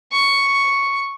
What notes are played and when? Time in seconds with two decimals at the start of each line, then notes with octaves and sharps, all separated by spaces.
0.12 C#6